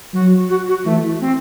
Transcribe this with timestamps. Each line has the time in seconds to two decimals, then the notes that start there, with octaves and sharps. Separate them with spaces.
0.14 F#3 F#4
0.50 F#4
0.68 F#4
0.85 E3 A3
1.21 C4